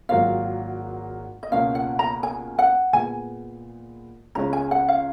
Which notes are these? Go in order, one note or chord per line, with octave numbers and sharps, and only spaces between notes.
G#1 G#2 F#3 A#3 F4 F5
D#5
C#2 B2 A#3 C#4 F4 F5
F#5
A#5
G#5
F#5
A#2 G#3 B3 G#5
C#2 C#3 G#3 C#4 A#5
G#5
F#5
F5